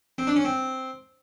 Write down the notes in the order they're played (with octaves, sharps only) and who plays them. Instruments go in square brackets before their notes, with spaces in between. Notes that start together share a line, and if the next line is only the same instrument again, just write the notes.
[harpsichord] C4
D4
C#4
C4